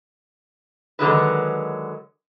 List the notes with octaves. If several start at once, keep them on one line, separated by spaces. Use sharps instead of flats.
D3 D#3 F#3 G#3 E4 B4